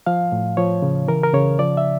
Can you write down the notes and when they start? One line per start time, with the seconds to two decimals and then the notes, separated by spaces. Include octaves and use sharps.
0.06 F3 F5
0.32 A2
0.57 F3 C#5
0.82 C#3
1.08 E3 A#4
1.24 A#4
1.34 C#3 C#5
1.59 F3 D5
1.77 E5